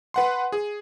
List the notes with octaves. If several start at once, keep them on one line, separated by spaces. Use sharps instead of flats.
B4 F#5 C6
G#4